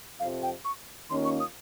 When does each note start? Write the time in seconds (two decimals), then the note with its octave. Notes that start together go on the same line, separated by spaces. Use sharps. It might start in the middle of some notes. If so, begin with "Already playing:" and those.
0.19 F2 F5
0.23 C3 F3
0.43 G5
0.65 C#6
1.09 D#2 D#3 A#3 C#4 F4 C6
1.25 C#6
1.40 D#6